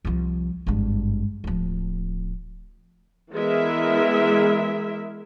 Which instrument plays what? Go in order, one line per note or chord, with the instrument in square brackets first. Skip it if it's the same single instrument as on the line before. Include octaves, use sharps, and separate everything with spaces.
[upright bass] C2 F3
G#1 G2
D1 F3
[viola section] E3 G#3 B3 G#4 A#4 E5